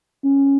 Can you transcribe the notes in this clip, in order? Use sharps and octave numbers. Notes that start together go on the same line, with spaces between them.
C#4